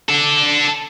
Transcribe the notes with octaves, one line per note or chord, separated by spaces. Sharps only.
D4 A4